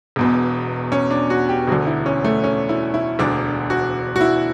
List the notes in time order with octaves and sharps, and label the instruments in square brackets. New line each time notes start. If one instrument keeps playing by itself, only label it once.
[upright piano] E1 E2 B2
C#4
D4
F#4
G4
E1 D2 D3 F#4
E4
C#4
A3
C#4
E4
E4
E1 D2 D3 D4
F#4
F#4
E4